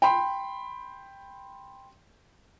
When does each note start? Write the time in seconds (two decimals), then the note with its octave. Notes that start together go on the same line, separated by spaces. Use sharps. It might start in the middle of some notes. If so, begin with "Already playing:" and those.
0.02 G5 B5 C6